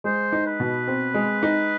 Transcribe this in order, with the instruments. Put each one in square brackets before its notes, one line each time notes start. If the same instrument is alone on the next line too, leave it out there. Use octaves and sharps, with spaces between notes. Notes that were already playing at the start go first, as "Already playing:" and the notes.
[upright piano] G#3 [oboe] C5
[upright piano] D#4
[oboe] B4
[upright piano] B2
C4
G#3
D#4